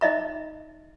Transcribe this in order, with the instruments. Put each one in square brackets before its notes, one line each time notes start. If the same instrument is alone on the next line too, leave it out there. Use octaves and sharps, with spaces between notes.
[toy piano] D#4 D#5 E5 A#5